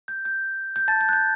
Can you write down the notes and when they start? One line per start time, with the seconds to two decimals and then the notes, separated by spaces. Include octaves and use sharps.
0.08 G6
0.25 G6
0.76 G6
0.88 A5 A6
1.01 G6
1.09 F#6
1.13 G6